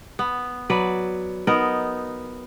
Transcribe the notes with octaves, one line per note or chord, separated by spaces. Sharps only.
B3
F#3 B4 D5
B3 D#4 A#4